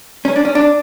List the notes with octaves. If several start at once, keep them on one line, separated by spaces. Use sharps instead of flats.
C#4
D4
C#4
D4